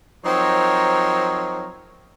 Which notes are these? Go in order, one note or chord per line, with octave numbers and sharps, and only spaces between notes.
F3 F#3 C4 D#4 A#4 C#5